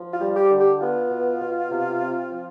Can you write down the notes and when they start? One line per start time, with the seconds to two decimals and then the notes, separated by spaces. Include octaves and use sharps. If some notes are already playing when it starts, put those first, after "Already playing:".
Already playing: F3
0.12 F4
0.21 G3
0.36 G4
0.50 D3
0.58 G4
0.81 B3 F4
1.10 B2
1.41 B2
1.71 C3
2.01 C4
2.32 F3